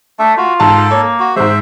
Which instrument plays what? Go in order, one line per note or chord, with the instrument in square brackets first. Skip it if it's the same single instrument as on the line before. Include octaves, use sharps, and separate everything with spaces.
[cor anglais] A3 [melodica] D4 E5
[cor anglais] F4 [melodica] F#4
[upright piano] G#2 A5 [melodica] A4
[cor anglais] A#3 [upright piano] C#5
[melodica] F#4
[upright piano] G#2 G#3 [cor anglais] C5 [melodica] E5